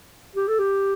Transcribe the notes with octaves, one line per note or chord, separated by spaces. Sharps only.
G4
A4
G4